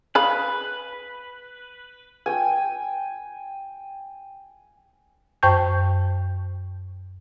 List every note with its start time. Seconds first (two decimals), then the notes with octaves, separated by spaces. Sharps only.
0.15 G#4 B4 F5 B5
2.26 G5 G#5
5.43 F#2 C5 G5 A5 C#6 G6